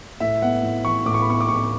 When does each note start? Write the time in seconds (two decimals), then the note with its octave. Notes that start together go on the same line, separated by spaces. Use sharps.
0.20 A2 E5
0.42 B3 F#5
0.63 A2
0.85 E3 C#6
1.06 A2 D6
1.14 C#6
1.22 B5
1.27 B3 C#6
1.41 D6
1.48 A2 C#6